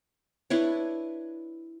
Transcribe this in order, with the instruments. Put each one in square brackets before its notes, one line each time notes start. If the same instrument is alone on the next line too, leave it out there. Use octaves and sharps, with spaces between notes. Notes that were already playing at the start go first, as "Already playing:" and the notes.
[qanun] D4 E4 B4 C#5